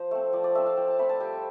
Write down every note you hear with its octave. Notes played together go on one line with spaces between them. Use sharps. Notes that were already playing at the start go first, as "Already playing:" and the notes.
Already playing: F3 C5
A3 C4
F3 D5
D5
A3 C4 E5
F5
F3 G5
A5
A3 C4 B5
A5
G3 G5